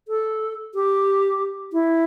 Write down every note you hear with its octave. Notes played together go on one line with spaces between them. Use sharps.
A4
G4
E4